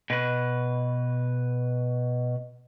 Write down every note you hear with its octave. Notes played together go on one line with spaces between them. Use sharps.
B2 B4